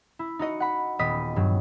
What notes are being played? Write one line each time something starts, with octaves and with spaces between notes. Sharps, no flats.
E4
D#4 F#4 D#5 C#7
F#5 B5
D#1 B3 D#5 D#6 B6
G2 F#3